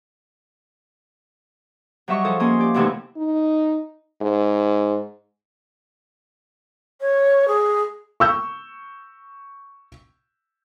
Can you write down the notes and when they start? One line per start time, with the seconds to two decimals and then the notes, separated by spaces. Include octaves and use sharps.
2.08 F#3 G3 D#5 E5 C#6
2.25 F3 G#4 A4 D#6
2.40 A#3 C#4 G#5 C6 D#6
2.59 G4 D5
2.74 F#2 C3 E3 A3 D#4
3.17 D#4
4.22 G#2
7.01 C#5
7.48 G#4
8.20 C#6 E6 G6